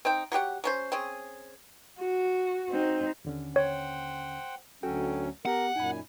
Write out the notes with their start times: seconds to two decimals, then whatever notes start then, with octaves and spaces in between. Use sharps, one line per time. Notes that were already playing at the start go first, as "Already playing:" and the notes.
0.05 C4 D#4 G5
0.32 F#3 F#4 G4 F#5
0.64 F#3 C#4 C5
0.92 C4 C#4 G#4
1.99 F#4
2.70 C4 D#4
3.25 D#2 D3 C#4
3.56 C5 C#5 F#5 G5
4.83 D2 F#3 C#4 F#4 A4 G5
5.46 B3 G4 A#4 F#5
5.76 F#2 A#2 D#4 G#5 B5